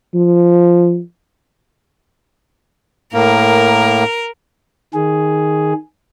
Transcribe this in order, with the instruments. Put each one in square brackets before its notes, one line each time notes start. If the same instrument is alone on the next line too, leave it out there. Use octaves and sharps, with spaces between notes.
[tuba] F3
[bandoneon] A2 A#3 [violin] A#4
[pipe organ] D#3 G#4